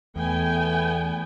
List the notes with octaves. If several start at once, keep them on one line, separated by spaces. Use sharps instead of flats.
E2 A3 B3 G5 G#5